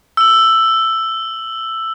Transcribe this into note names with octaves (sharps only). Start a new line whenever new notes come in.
E6 F#7